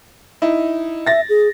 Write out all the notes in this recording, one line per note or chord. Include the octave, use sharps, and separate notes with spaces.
D#4 E4
E5 A6 A#6
G#4